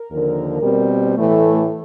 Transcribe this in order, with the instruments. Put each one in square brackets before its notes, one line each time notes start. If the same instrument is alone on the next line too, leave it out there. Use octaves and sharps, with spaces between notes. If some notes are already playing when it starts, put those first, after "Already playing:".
Already playing: [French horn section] A#4
D#2 D3 F3
B2 G3 C4
A2 E3 A3